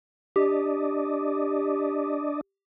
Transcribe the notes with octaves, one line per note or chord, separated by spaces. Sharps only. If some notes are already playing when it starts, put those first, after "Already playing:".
D4 G4 D5 D#5